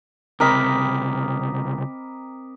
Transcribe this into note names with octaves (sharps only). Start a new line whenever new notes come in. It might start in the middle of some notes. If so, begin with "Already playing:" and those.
C#2 C3 C4 A#4 D#5 B5 D6 B6